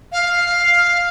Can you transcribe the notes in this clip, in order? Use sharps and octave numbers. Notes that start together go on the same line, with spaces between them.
F5